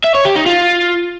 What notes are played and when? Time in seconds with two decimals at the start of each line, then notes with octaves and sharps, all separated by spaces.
0.04 E5
0.15 C#5
0.25 G4
0.36 D#4
0.46 F4